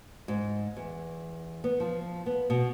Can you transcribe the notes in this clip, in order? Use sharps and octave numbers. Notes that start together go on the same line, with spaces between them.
G#2
E2
B3
F3
B3
B2